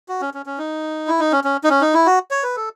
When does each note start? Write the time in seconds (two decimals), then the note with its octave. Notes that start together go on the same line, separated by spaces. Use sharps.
0.09 F#4
0.21 C#4
0.34 C#4
0.46 C#4
0.58 D#4
1.08 E4
1.19 D#4
1.32 C#4
1.44 C#4
1.64 D#4
1.70 C#4
1.81 D#4
1.94 E4
2.06 F#4
2.31 C#5
2.43 B4
2.56 A4